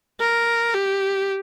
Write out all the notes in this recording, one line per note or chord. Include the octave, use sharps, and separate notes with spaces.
A#4
G4